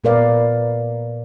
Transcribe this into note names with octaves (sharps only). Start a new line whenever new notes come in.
A#2 B3 A#4 B4 D5 F5